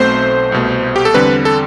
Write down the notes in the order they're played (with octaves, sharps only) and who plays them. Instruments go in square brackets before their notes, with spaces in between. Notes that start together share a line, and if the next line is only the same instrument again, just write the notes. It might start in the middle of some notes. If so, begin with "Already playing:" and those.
Already playing: [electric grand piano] B1 B2 A3 C4 C5
C2 B2 A3
G4
A4
E2 D3 G3 C4 B4
A4